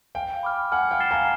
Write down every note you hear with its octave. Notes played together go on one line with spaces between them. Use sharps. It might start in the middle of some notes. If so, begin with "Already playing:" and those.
F5 G5 G#5
B5 D6 F6
F#5 G#5 F6
F5 G5
A6 C7 E7 G7
G#5 A#5